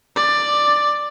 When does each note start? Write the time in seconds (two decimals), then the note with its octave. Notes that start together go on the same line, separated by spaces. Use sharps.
0.16 D5